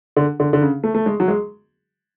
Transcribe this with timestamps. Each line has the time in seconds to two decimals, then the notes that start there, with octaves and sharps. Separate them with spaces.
0.16 D3
0.40 D3
0.53 D3
0.61 C#3
0.84 A3
0.95 A3
1.06 G#3
1.20 F#3
1.28 G#3